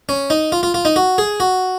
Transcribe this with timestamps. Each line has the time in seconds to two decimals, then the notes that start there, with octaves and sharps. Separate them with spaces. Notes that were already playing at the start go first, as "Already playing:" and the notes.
0.09 C#4
0.30 D#4
0.52 F4
0.63 F4
0.74 F4
0.85 D#4
0.96 F#4
1.18 G#4
1.40 F#4